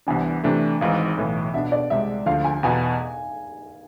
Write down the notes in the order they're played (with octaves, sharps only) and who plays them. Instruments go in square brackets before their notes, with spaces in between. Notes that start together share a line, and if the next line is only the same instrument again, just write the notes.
[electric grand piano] C2 C3 E3 B3 D4 [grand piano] G#5
[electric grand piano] C3 E3 A3 D4
[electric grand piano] G#1 G#2 E3 [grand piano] F5
[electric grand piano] B1 A2 E3
[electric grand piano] B2 B3 D4 [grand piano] E5
[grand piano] D5
[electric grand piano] C2 C3 G#3 [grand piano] E5
[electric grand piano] D2 D3 F3 [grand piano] F5
[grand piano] G#5
[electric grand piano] E2 B2 B3 [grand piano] G#5